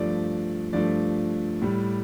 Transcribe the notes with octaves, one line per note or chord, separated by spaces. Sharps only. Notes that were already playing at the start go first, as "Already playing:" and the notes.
Already playing: G2 F3 A3 D5
G2 F3 A3 D5
A2 G3